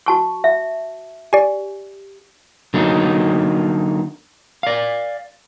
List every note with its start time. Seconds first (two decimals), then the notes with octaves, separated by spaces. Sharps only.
0.06 F#4 A5 C#6
0.44 E5
1.33 G4 D5 G#5
2.74 D3 F#3 A#3 D#4
4.63 D5 F5